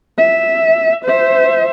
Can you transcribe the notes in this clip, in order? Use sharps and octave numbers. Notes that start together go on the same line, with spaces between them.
E5
C5 E5